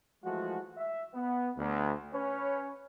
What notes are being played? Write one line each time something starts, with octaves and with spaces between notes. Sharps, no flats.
E3 F3 G#3 A3 F#4
E5
B3
D2
C#4 B4 C#5